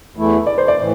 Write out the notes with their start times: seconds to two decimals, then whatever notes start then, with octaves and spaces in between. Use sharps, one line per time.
0.16 E2 E3 A3 E4
0.47 D5
0.58 C5
0.68 D5
0.78 A2 E3